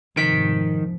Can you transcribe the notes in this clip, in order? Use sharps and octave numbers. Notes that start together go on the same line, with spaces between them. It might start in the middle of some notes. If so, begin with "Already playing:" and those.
F1 G#2 D#3 F3 B6 D7